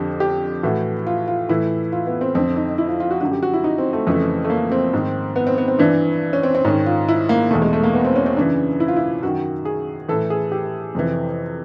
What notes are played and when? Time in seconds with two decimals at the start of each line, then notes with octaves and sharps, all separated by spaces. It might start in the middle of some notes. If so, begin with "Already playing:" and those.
Already playing: F2 D3 G4
0.20 G4
0.63 A2 E3 F#4
1.07 F4
1.28 F4
1.49 A2 E3 E4
1.92 F4
2.07 B3
2.21 C4
2.35 F2 D3 C4
2.57 D#4
2.78 E4
2.89 F4
3.00 F4
3.11 F#4
3.21 F#2 D3 F#4
3.32 G4
3.43 F#4
3.53 E4
3.64 D#4
3.78 C4
3.93 A3
4.07 F2 C#3 E3 A3
4.44 A3
4.50 A#3
4.72 C4
4.94 G#2 D#3
5.36 B3
5.47 C4
5.58 B3
5.68 C4
5.79 G2 E3 D4
6.33 C#4
6.43 C4
6.55 C4
6.65 G#2 D#3 C#4
6.86 F4
7.08 E4
7.29 A#3
7.51 B2 A3
7.54 E2
7.62 G#3
7.73 A3
7.83 A#3
7.94 B3
8.05 C4
8.16 C#4
8.26 C4
8.37 F#2 C#3 E3 D4
8.80 E4
8.88 F4
8.96 E4
9.22 F#2 D#3 F#4
9.65 G#4
10.08 A2 E3 A4
10.30 G#4
10.52 G4
10.95 F2 C3 E3